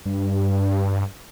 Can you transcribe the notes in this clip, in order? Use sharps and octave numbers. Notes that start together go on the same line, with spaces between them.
G2